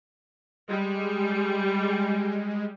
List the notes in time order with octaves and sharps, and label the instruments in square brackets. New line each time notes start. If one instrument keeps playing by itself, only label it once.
[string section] G3 [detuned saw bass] G#3